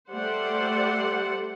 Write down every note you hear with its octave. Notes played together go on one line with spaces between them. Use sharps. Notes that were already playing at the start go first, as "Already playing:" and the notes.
G3 A3 C5 D5 F#5